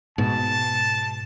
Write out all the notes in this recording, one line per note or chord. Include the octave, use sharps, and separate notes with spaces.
G#2 B2 A5